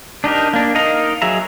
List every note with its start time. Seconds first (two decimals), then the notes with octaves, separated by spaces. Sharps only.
0.24 D4 D#4 G4 A#4
0.53 A#3 D4
0.75 D#4 A#4 D#5 F5 A#5
1.22 F#3 G#4 E5 A#5